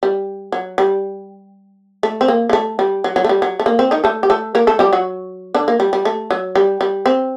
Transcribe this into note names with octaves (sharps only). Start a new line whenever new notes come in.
G3
F#3
G3
A3
C4
A#3
A#3
A3
G3
F#3
F#3
A3
G3
F#3
A3
A#3
C4
D#3 D#4
A3 A4
G4
A3 A4
A#3 A#4
A3 A4
G3 G4
F#3 F#4
D3 D4
A#3
G3
G3
A3
F#3
G3
G3
C4